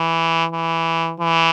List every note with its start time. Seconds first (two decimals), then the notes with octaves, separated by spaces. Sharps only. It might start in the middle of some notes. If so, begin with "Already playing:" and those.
Already playing: E3
0.52 E3
1.20 E3